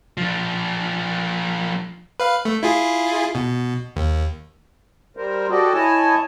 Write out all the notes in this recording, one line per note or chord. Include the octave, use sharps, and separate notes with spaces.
F3 D4
B4 F5
A3
E4 F4 G#4
B2
D#2
G3 A#4 C5
F#4 G4 A4 D5 D#5
E4 C#5 D#5 G#5 A5